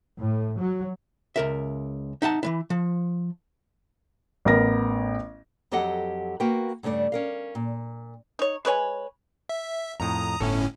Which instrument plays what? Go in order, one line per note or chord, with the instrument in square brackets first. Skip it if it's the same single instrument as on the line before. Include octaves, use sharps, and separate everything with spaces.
[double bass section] A2
F#3
[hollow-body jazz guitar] C#2 A#4 E5
D#4 E5 F#5 A5
E3 G#3 E4
F3
[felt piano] A1 B3 A#4 A#6
[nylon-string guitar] F2 F#3 G4 A4 D#5 F#5
A#3 F#4 A#4 B4 G5
G2 C#3 A3 A#4 D5
C#4 A#4 F5
A#2
[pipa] D#4 C#5
G#3 B4 C#5 G#5
[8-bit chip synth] E5
[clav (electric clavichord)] F2 A2 [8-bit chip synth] A#5 D#6
[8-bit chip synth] G1 A2 C#4 [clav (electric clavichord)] A4 C#5 E5